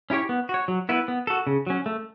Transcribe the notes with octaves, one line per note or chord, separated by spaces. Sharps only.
C#4 E4 G4 C#5
B3
F#4 C#5
F#3
B3 E4 B4
B3
F#4 A4
C#3
F#3 C#4
A3